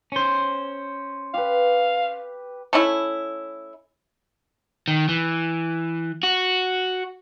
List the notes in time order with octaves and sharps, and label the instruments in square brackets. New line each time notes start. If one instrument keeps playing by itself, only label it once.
[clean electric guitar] C#4 C5
[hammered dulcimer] G4 B4 [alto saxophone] F5
[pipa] A3 C#4 E4
[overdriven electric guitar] D#3
E3
F#4